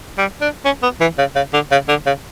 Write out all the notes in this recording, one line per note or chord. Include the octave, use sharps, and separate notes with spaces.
G3
D4
C#4
B3
E3
C#3
C#3
D3
C#3
D3
C#3